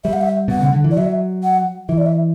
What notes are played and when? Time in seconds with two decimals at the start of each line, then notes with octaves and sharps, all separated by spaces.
0.04 G3 E5
0.13 F#5
0.21 E5
0.48 B2 F#5
0.60 C#3
0.73 D3
0.84 E3
0.91 D5
0.97 F#3 E5
1.43 F#5
1.89 E3 E5
1.98 D5
2.06 E5